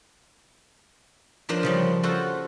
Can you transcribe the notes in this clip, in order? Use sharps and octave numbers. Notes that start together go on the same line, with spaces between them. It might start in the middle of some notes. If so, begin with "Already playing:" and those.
F3 D4 F4 A#4 C5
C#3 F3 G3
F4 F#4 A4 C5